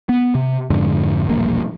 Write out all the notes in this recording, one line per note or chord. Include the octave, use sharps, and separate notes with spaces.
B3
C3
F2 G#2 D3
E1 A#1 G2 A#3